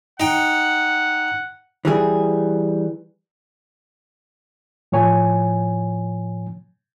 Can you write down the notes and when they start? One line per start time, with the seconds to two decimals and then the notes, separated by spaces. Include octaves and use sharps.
0.20 D#4 F#5 G5
1.85 E3 G3 G#4
4.92 A2 F3 C#5 G#5